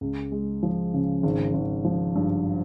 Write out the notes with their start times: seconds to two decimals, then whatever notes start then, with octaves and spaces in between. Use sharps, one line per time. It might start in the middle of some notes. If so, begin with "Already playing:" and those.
0.01 C#2
0.32 G#3
0.63 F3
0.94 C#3
1.23 G#1
1.54 G#1
1.85 F3
2.16 G2